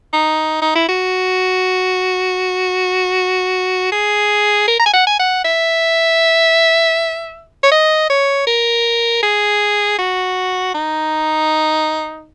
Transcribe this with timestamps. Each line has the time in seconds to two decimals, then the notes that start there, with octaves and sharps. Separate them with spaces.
0.13 D#4
0.62 D#4
0.75 E4
0.89 F#4
3.92 G#4
4.68 A#4
4.80 A#5
4.86 G#5
4.93 F#5
5.07 G#5
5.19 F#5
5.44 E5
7.63 C#5
7.72 D#5
8.10 C#5
8.47 A#4
9.23 G#4
9.98 F#4
10.75 D#4